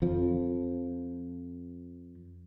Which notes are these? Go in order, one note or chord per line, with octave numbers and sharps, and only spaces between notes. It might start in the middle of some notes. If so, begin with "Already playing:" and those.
F2 F3